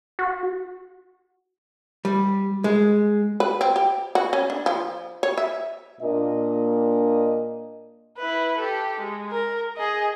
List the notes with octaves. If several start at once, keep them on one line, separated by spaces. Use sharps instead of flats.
F#4
G3
G#3
B4
C4
G4
F#4
C#4
D4
F3
C#5
E5
A#2 A#3 D4 D#5
E4 B4
G4 A4
G#3
A#4
G#4 D#5